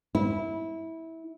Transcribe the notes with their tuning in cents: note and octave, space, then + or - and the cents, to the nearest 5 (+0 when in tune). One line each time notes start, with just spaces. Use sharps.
E4 -20